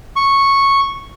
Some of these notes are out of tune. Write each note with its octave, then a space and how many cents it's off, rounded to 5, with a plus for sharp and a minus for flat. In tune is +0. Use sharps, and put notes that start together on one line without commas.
C#6 -5